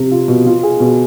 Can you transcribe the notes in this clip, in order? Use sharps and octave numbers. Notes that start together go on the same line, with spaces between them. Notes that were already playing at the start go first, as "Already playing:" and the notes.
Already playing: C3
F4
B2
F4
G#4
B2